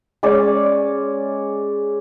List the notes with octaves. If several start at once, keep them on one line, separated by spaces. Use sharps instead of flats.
G#3 C#4 C#5 D5